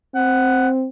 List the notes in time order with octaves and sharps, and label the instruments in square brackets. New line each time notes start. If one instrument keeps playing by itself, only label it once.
[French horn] C4 [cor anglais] F#5